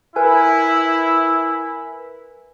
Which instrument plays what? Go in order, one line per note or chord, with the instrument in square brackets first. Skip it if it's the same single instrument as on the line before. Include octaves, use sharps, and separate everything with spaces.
[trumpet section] E4 [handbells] A#4 B4 G#5